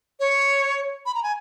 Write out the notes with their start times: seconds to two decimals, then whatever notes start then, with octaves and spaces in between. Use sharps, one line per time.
0.20 C#5
1.06 B5
1.15 A#5
1.23 G#5